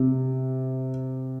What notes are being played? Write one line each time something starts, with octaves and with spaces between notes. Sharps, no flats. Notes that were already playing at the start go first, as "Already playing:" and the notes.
Already playing: C3